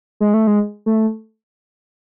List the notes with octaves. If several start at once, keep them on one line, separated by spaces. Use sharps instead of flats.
G#3
A3
G#3
A3